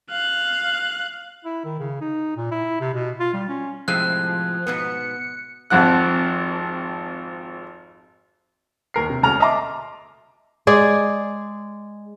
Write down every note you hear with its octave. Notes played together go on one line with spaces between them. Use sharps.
F5 F#6
E4
D#3
C#3
D#4
A#2
E4
C3
B2
F4
G3
C#4
A2 C3 F3 G#3 F#6
G#2 B2 B3 C#7
G#1 F2 F3 F#5 F#6
D#2 A#4 C7
C3
E1 D2 C#3 A#5 F6 F7
D#5 E5 A5 A#5 C6 D6
G#3 G#4 D5